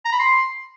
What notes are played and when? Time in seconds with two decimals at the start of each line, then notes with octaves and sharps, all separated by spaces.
0.05 A#5
0.12 B5
0.20 C6